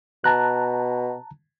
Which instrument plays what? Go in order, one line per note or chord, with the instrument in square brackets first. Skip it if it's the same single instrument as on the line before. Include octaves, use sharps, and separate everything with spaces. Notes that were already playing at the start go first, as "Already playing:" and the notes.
[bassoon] B2 [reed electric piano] A5 A#5 F#6